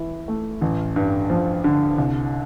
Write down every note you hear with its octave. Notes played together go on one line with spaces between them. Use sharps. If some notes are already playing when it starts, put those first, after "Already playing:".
Already playing: E3 E4
A3
A1
G2
F3
D3
C2